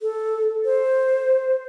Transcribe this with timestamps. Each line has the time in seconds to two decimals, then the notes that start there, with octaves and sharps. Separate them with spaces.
0.01 A4
0.65 C5